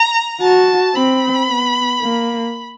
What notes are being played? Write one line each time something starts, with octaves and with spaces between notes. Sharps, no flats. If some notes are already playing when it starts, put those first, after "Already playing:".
Already playing: A#5
F#4 A5
C4 B5
B3
A#3